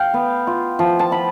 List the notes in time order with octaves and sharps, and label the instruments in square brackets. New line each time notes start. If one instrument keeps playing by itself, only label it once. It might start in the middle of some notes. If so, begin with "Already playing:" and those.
Already playing: [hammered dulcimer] F5 G5
B3
F4
F3
A5
F4 B5